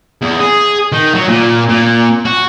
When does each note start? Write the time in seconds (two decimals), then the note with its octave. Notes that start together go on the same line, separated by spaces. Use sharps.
0.22 E2
0.40 G#4
0.92 D#3
1.14 F#3
1.28 A#2
1.69 A#2
2.25 F#4